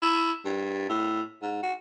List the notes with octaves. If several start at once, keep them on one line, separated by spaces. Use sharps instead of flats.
E4
G2
A2
G#2
F#4